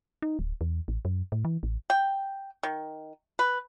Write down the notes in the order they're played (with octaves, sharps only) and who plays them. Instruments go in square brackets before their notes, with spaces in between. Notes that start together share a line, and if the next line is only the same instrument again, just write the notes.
[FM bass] D#4
D1
E2
A1
F#2
A2
E3
A1
[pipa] G5
D#3
B4